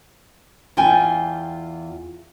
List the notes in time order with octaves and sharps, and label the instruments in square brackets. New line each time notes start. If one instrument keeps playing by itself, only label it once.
[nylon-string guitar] E2 F4 G5 G#5